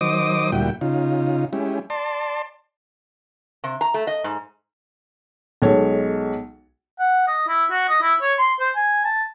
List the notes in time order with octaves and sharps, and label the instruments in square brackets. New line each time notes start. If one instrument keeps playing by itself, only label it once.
[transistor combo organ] D#3 F#3 C5 D#5 D6 D#6
D2 A#2 G3 E4 F#4 G5
C#3 D#4 F4
G#3 C#4 E4 G4
D5 A5 C6
[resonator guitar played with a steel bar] C3
A#5
A3
D#5
G#2
[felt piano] B1 G#3 A4 C#5
[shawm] F#5
D#5
E4
F#4
D#5
E4
C#5
C6
C5
G#5
A5